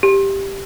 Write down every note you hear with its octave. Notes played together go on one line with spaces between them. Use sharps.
G4